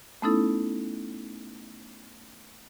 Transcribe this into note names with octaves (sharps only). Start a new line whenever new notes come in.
A3 B3 C#4 D#4 E4 A4